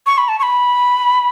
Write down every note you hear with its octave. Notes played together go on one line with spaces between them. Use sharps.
C#6
B5
A5
C#6
B5